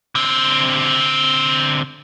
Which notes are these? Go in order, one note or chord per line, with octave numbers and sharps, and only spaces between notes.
D3 C4